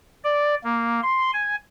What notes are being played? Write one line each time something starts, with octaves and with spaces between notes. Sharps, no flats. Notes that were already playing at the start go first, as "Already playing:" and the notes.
D5
A#3
C6
G#5